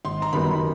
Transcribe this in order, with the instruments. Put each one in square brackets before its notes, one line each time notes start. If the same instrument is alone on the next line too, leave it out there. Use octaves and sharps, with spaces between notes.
[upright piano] G#1 [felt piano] C6
[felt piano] A#5
[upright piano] F#2 D#3 G3 B3 [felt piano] B5